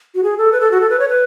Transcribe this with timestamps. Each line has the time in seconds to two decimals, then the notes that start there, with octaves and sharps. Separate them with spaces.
0.15 F#4
0.23 G#4
0.38 A4
0.52 B4
0.61 A4
0.71 F#4
0.81 A4
0.90 B4
0.99 C#5
1.09 B4